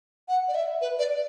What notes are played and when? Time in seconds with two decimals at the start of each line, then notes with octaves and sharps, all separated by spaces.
0.28 F#5
0.48 D5
0.55 E5
0.81 B4
0.99 D5